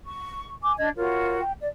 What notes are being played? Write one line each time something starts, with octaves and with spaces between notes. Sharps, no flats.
C#6
G#5 D6
D4 D#5 G#6
F4 F#4 A#4 C#5
G5
D5